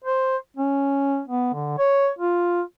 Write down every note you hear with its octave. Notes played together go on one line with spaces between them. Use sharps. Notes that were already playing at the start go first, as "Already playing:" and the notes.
C5
C#4
B3
D3
C#5
F4